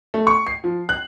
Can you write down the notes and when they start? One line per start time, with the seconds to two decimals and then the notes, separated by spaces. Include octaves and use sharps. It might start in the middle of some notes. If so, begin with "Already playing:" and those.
0.14 A3
0.27 C#6
0.47 C7
0.64 F3
0.89 F#6